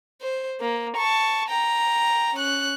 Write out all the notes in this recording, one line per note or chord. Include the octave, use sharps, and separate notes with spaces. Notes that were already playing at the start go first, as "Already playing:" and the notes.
C5
A#3
A5 C#6
G5 A#5
C#4 F#6